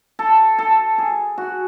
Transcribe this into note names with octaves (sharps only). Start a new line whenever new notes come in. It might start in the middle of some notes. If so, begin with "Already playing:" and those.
A4
A4
G#4
F#4